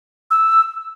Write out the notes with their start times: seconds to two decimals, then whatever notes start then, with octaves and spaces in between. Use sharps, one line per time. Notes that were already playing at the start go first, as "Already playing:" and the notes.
0.31 E6